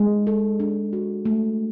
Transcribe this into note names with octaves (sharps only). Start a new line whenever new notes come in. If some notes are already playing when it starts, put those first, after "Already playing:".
Already playing: G#3
A4
D4
F#4
A3